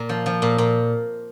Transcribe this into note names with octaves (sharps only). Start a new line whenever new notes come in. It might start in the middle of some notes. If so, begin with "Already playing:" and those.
Already playing: A#2
F3
F3
A#2
A#2